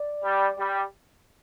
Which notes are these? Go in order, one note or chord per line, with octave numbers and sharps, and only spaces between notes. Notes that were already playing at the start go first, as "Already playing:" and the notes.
Already playing: D5
G3
G3